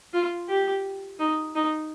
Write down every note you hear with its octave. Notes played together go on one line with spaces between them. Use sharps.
F4
G4
D#4
D#4